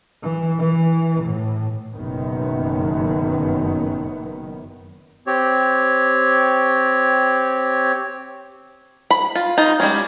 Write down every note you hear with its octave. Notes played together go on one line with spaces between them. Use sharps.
E3
E3
A2
F#1 F#2 B2 D#3 B3
C4 G4 C#5
B5
F4
D#4 F4
G3 G#3 C#4